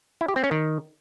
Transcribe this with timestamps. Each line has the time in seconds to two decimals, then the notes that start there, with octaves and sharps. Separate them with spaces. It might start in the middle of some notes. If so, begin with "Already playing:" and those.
0.21 E4
0.28 G4
0.36 C4
0.44 C#4
0.51 D#3